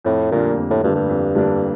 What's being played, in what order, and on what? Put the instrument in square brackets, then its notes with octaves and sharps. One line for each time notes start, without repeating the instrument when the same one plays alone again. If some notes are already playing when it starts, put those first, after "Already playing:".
[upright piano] F2 [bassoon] A2
[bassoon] A#2 [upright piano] D3 G3 A#3 D4
[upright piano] F2
[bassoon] A2
[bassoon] G2 [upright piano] D3 G3 A#3 D4
[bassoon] G2
[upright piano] F2
D3 G3 A#3 D4